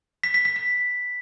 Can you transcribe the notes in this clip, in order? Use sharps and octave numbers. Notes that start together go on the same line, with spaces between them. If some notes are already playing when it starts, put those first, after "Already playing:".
B6
B6
B6
B6